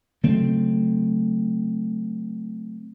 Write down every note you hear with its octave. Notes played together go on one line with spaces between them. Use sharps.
C#3 F#3 A3 C4